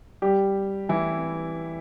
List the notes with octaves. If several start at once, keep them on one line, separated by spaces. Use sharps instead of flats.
G3 G4
E3 E4